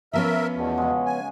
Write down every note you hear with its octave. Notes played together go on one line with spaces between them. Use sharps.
F3 B3 C#4 A#4 E5
E2 B2 A3
C#3 G#3
G#5